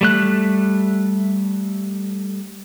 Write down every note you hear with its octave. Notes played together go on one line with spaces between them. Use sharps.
G3 A3 F#6